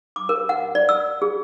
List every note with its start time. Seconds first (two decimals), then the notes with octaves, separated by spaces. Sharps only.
0.16 D6
0.29 A#4
0.49 F#5
0.75 D5
0.89 E6
1.22 G#4